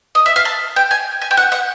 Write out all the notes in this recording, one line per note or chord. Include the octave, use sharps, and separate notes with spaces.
D#5
E5
F5
A5
G5
G#5
G#5
G5
F#5
F#5